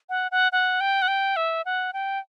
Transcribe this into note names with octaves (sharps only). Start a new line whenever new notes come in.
F#5
F#5
F#5
G5
F#5
G5
E5
F#5
G5